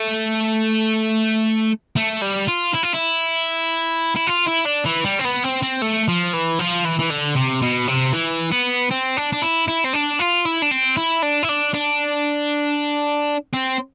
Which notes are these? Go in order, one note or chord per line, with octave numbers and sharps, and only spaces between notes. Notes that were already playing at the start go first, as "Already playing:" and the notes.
Already playing: A3
A3
G3
F4
E4
F4
E4
E4
F4
E4
D4
E3
G3
C4
B3
C4
C4
A3
F3
E3
F3
E3
E3
D3
C3
B2
C3
E3
B3
C4
D4
D4
E4
E4
C4
D4
F4
E4
D4
C4
E4
D4
E4
D4
D4
C4